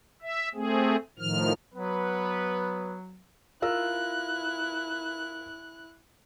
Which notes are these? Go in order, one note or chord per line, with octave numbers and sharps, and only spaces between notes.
E5
A3 C4 G#4
A2 D#3 F3 F6
F#3 B3 B4
E4 F4 A#4 E6 F#6